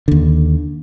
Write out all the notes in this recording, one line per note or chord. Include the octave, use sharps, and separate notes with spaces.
D#2 D3